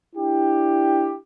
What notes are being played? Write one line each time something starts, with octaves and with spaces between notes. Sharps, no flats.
D4 E4 G4